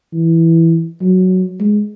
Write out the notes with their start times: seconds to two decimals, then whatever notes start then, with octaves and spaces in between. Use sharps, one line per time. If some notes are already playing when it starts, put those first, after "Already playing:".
0.13 E3
1.01 F#3
1.60 G#3